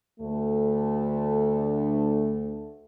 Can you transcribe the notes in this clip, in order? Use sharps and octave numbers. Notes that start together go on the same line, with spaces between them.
D2 A3